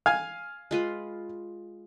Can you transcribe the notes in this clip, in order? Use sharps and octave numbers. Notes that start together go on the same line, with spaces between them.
F5 G#5
G#3 F4 B4